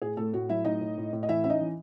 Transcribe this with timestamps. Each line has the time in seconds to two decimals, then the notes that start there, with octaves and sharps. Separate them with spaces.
0.02 A2 G#4
0.17 A2 A3 A4
0.33 A2 F#4
0.49 F#3 E4 E5
0.65 A2 D#4 D#5
0.81 A2
0.97 A2
1.13 A2
1.23 D#5
1.29 E3 E4 E5
1.44 C#4 E5
1.50 D#4 D#5
1.61 E3